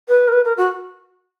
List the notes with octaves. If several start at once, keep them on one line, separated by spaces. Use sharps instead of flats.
B4
A#4
B4
A#4
F#4